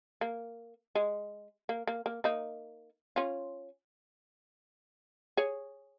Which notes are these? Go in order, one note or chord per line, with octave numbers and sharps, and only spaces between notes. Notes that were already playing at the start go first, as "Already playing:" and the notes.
A#3
G#3
A#3
A#3
A#3
A#3 D#4
C#4 F4
G#4 C#5